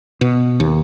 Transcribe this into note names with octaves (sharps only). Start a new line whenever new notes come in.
B2
D#2